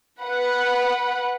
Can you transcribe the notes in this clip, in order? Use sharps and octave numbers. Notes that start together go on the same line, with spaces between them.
B4 F#5 B5